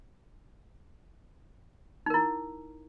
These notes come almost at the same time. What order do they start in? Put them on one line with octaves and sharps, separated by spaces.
D#4 A#4 E4